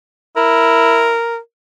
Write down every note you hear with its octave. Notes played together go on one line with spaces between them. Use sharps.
E4 A#4